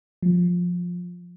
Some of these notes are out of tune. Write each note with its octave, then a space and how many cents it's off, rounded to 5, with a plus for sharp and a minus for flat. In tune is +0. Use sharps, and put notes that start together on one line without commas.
F3 +15